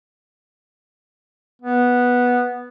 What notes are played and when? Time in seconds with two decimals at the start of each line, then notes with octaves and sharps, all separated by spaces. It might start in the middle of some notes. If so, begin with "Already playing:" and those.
1.61 B3